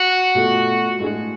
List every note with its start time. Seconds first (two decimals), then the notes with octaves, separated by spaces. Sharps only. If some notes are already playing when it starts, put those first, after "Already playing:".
Already playing: F#4
0.35 B2 A3 F4
0.99 A2 G#3 D4 G#4